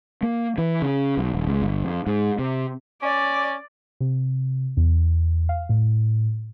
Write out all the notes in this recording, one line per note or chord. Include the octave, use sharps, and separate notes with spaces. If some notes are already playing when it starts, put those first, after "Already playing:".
A#3
E3
C#3
B1
D#1
C#2
G1
F2
G#2
C3
C#4 D5
C3
E2
F5
A2